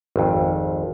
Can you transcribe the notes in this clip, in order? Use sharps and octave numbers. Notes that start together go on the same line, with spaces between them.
G#1 F2